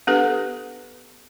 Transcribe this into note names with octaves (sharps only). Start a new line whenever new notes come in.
B3 D4 G4 A4 B4